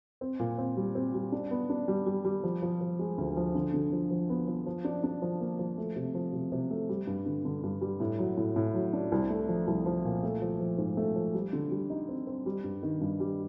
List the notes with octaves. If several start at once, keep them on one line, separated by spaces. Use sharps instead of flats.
C4
A#2
C4
G3
C4
G3
D4
B3
D4
G3
G3
G3
F3
F3
F3
G#3
D2
F3
D3
D3
F3
F3
B3
F3
F3
D4
D4
F3
A#3
F3
A3
C3
F3
C3
C3
A3
G3
G2
D3
D3
G2
G3
A2
F#3
A2
A2
F#3
D4
C2
A3
F3
C2
F3
A#2
A3
F3
F3
G#2
A3
F3
G3
D3
G3
D#4
C4
C4
G3
G2
D#3
G2
G3